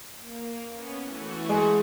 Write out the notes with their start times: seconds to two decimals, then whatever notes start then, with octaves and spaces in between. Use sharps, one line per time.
0.17 A#3
0.70 B3 C#4
1.03 E3 A3 F#4
1.49 G#3